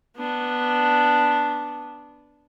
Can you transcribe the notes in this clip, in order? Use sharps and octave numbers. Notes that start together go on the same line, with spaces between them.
B3 D4